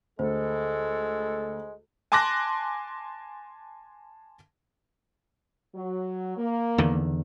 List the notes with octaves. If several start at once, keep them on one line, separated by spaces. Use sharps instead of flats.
D2 G#3 A4 C5
G#5 A5 C6 D6 F#6 A#6
F#3
A#3
E2 D3 D#3